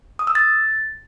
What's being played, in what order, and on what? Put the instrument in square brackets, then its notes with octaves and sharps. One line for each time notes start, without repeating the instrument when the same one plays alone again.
[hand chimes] D#6
E6
A6